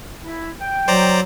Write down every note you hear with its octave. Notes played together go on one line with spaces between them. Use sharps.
E4
G5
F#3 C5 D5 A#5